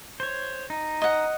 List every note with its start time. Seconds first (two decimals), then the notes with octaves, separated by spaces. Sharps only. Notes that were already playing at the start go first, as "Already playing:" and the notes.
0.20 C5 C#5
0.70 D#4
1.02 D#5 F#5